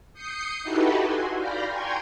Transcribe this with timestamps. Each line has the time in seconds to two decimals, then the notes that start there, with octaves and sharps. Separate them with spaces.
0.14 D#6 G6 C7 C#7
0.63 D#4 E4 F#4 G4 A4 B4
1.02 F#4 G#5 C6
1.36 D5 F5 B5 F6 G6 A#6
1.67 G5 G#5 A#5 C6 C#6 G#6